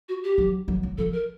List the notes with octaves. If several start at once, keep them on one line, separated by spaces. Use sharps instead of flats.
F#4
G4
F#3
F#3
F#3
F3 A4
A#4